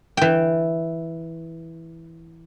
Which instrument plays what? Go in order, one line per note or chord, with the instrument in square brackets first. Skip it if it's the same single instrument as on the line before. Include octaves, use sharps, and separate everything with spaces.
[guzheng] E3 G5